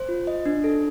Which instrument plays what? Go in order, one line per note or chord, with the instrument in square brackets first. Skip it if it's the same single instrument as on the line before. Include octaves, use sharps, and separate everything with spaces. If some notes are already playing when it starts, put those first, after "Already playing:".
Already playing: [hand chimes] C5
F4
D#5
D4
A4